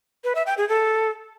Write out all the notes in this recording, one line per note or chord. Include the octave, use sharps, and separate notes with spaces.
B4
E5
G5
G#4
A4